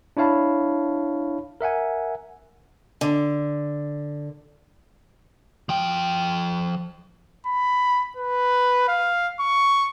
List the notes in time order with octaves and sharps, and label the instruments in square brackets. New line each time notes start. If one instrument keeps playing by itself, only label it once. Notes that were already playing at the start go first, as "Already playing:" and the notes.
[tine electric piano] D4 E4 C#5 F5 A5 B5
A#4 E5 F#5 G#5
[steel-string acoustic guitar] D3
[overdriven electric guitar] F3 G5
[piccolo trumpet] B5
B4
F5
C#6